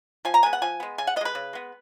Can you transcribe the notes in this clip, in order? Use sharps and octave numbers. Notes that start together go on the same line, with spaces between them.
F3 G#5
A#5
G#3 B3 G#5
F#5
F3 G#5
G#3 B3
C#3 G#5
F#5
B3 D#5
G#3 B4
C#3
G#3 B3